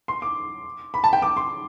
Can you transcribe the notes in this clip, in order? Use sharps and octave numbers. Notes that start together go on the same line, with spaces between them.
C6
D6
B5
A5
G5
D6
C6